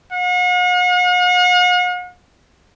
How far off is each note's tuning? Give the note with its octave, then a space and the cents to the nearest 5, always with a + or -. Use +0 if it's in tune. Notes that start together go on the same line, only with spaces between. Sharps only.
F#5 -45